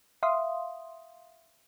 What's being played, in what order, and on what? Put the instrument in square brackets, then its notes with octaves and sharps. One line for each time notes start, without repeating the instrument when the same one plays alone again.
[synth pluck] E5 F5 C6 D#6